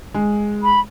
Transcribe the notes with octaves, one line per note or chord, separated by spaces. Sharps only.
G#3
B5